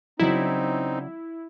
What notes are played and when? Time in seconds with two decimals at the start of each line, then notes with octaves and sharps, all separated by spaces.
0.20 C#3 F#3 C4 D#4 E4 D5